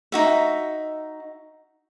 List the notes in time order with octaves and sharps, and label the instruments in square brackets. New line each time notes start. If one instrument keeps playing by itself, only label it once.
[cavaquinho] D#4 F#4 E5